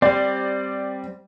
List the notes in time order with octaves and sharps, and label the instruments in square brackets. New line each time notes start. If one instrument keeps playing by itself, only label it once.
[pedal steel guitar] G3 C4 [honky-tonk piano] D5